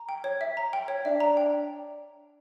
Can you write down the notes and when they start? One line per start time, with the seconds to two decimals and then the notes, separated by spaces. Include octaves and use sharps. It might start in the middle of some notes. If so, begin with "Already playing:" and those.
Already playing: A#5
0.09 G5
0.24 C#5
0.41 E5
0.57 A#5
0.73 G5
0.88 C#5
1.05 D4 E5
1.20 A#5
1.37 G5